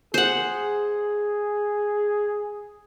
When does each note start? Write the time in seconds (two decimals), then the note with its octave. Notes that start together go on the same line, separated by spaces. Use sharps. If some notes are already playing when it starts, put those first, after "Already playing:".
0.14 G#4 C5 F#5